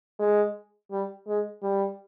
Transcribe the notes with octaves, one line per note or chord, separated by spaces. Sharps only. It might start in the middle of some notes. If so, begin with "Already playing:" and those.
G#3
G3
G#3
G3